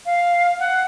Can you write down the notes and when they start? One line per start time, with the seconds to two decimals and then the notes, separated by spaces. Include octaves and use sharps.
0.06 F5
0.60 F#5